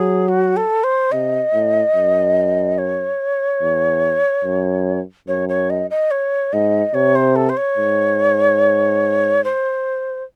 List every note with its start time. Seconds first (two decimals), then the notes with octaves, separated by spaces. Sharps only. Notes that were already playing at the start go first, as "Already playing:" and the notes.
Already playing: F#3 G#4
0.28 F#4
0.57 A4
0.84 C5
1.12 C3 D#5
1.53 A2
1.95 F#2
2.78 C#5
3.62 E2
4.44 F#2
5.28 F#2 C#5
5.49 C#5
5.70 D#5
5.90 D#5
6.11 C#5
6.53 G#2 D#5
6.94 C3 C#5
7.15 C5
7.36 A4
7.49 C5
7.57 C#5
7.77 G#2
9.44 C5